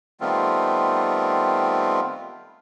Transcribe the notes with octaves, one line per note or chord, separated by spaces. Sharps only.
D#3 G3 A3 B3 C4 F4